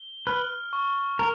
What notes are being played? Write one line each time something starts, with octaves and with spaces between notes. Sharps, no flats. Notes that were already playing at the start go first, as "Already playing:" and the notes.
Already playing: G7
B4 F6
C#6
A#4